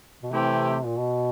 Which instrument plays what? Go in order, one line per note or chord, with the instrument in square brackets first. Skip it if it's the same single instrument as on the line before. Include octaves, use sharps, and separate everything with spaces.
[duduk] B2
[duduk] C3 [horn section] E3 A3 C4 E4 G4
[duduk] A#2
B2